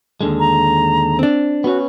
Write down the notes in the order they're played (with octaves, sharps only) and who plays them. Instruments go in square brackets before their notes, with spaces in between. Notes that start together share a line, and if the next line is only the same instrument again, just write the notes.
[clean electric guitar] D#2 D3 G#3
[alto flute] A#5
[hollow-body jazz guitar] C4 D4
[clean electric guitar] B3 C#4 [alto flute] F#4